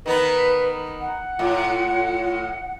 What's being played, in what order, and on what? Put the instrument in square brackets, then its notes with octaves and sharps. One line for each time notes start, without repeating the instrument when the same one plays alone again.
[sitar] D#3 B3 D#4 [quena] B4
[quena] F#5
[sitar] A2 [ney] F4